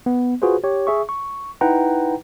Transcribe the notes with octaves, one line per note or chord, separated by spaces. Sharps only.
B3
F4 F#4 G#4 B4 C5
G4 C#5
G#4 E5 C#6
C#6
D#4 E4 B4 F#5 G5 A#5